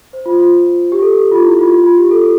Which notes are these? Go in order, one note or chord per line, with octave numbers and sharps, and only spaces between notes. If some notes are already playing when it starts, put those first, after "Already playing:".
C5
F4
F4
G4
A4
G4
F4
E4
F4
F4
F4
G4
A4